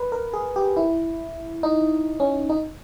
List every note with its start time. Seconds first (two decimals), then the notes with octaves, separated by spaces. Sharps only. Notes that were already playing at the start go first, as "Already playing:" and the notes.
Already playing: B4
0.12 A#4
0.33 G#4
0.56 G4
0.77 E4
1.63 D#4
2.20 C#4
2.49 D#4